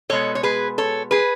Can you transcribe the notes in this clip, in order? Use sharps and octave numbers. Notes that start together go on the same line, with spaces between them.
B2 G#3 B3 A4 C#5
C#5
G#4 B4
A4 C#5
G#4 B4